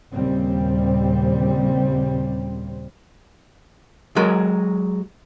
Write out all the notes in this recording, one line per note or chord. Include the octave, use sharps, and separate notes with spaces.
D#2 A#2 C#3 G3 C4
F#3 G#3 A#4